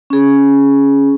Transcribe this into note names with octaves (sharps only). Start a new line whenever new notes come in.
C#4 G#4